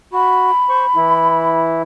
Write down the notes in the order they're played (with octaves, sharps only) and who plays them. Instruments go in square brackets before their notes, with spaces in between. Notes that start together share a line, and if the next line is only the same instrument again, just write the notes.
[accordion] F#4 [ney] B5
[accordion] C5 C#6
E3 E4